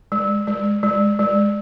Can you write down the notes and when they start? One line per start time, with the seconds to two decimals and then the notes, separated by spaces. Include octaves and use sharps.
0.12 G#3
0.47 G#3
0.83 G#3
1.19 G#3